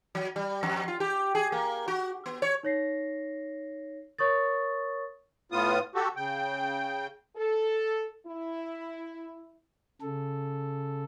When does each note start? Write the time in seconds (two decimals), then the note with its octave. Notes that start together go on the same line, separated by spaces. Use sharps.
0.15 F#3
0.36 G3
0.63 F2
0.88 F4
1.00 G4
1.35 G#4
1.52 A#3
1.88 F#4
2.26 B3
2.42 C#5
2.63 D#4 C#5 A#6 C7
4.18 A#4 C#5 C#6 D#6 A6
5.52 A2 B3 F4 D#6
5.95 F#4 G4 A4
6.16 C#3 G5
7.36 A4
8.25 E4
10.01 C#3 A4